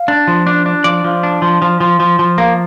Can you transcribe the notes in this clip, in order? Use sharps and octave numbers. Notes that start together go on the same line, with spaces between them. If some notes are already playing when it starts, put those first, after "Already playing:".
Already playing: F5
D4
F3
D4
D4
F3 D5
F3
D4
F3
F3
F3
F3
F3
A#3